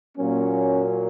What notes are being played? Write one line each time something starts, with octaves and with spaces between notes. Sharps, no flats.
A#2 F#3 A#3 C#4